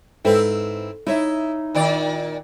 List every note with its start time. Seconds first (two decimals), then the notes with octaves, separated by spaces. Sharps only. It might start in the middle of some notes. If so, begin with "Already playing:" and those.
0.25 G#2 C4 E4 A4 B4
1.07 D#4 E4 C#5 E5
1.75 A#2 D#3 D5